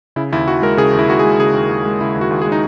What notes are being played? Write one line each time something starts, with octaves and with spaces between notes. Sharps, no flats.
C#3 E4
D#2 E4
D#2 F#4
G#3 A#4
C#3 G#4
D#2
E4
D#2 F#4
G#4
G#3
C#3 G#4
D#2
D#2
G#3
C#3 E4
D#2
F#4
D#2
G#4
G#3
D#4